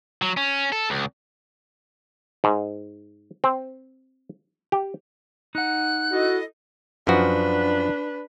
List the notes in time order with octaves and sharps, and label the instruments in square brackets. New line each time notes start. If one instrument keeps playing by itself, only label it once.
[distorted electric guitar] F#3
C#4
A4
C#2
[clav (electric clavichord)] G#2
C4
G4
[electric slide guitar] D#4 F#5 [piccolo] F#6
[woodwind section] E4 A4 D#5 [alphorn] F#4
[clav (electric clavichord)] F#2 F3 F#4 [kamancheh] D4 B4